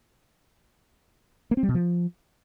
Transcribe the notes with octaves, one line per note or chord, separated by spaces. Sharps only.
A#3
C4
G3
B2
F3